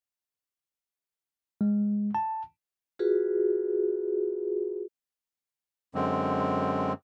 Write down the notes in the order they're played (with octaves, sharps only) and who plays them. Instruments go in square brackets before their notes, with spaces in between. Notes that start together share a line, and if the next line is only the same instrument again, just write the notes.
[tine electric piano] G#3
A5
[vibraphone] F4 F#4 G#4 B4
[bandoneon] F#2 D3 G#3 C4